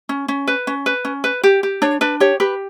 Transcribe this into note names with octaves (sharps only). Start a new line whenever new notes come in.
C#4
C#4
B4
C#4
B4
C#4
B4
G4
G4
D4 C#5
D4 B4
G4 C#5
G4 B4